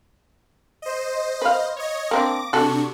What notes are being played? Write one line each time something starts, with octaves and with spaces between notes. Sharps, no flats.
C5 D#5
B4 F5
C#5 D#5
A#3 C4 D4 D6 A#6
C3 D4 F#4 A4 C#6